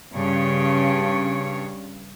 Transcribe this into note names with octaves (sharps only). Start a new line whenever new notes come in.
G2 C#3 C#5